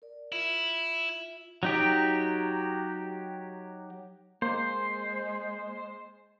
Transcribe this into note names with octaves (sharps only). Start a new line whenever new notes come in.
A#4 D5
E4 F4 E5
F#3 D#4 G4
G#3 A#3 C5